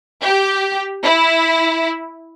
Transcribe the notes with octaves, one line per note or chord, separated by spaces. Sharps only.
G4
E4